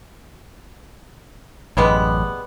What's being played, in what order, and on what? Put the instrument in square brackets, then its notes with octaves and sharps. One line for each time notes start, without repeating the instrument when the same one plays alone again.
[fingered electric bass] A1 F#2 [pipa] G3 G#3 B3